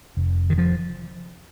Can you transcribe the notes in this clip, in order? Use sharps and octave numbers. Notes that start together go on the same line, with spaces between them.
F1
D#3
F3